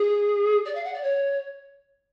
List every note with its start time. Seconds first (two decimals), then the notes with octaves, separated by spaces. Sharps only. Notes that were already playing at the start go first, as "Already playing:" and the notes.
Already playing: G#4
0.65 D5
0.75 F5
0.84 F#5
0.94 D5
1.03 C#5